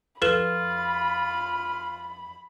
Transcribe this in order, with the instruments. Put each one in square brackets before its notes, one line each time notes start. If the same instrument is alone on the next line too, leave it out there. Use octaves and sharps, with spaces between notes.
[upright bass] F2 [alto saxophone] F4 [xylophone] A4 B4 E7 [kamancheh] B5